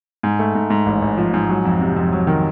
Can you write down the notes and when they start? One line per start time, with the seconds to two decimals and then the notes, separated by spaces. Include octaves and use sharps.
0.23 G#2
0.39 A3
0.55 G#2
0.70 G#2
0.86 A1
1.02 A1
1.18 F3
1.34 G#2
1.49 F#3
1.65 F2
1.81 C3
1.96 F2
2.12 F#3
2.27 D#3